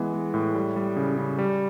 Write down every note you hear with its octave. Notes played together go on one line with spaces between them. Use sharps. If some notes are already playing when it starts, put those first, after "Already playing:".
Already playing: E3 G#3 B3
G#3
A2
G3
G3
C#3
C#3
G3